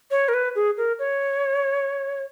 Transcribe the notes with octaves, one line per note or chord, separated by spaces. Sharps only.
C#5
A#4
B4
G#4
A#4
C#5